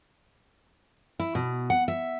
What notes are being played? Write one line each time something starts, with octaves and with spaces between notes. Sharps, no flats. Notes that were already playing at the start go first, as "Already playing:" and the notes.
E4
B2
F#5
E5